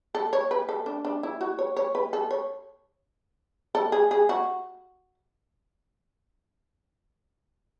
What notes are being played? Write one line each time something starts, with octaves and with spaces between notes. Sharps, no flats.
A4
C#5
B4
A4
D4
D4
E4
F#4
C#5
C#5
B4
A4
C#5
A4
G#4
G#4
F#4